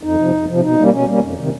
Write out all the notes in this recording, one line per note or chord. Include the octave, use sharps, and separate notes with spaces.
F2 D#4
C3 F3
F2
C3 F3
B2 D#4
G3 A#3 C#4
B2 C#4
G3 A#3 C#4
F2
C3 D#3